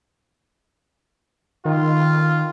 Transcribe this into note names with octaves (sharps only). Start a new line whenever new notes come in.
D#3 F4